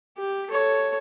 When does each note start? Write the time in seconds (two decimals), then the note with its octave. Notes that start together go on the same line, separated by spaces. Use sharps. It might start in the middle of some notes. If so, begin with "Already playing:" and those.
0.18 G4
0.50 A4 C#5